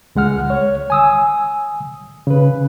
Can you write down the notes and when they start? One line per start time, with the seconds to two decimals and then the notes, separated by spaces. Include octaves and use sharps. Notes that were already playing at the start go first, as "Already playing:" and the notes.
0.16 C#2 G#3 F#5 F6
0.50 C#5
0.90 G#5 D#6 E6
2.27 C#3 B4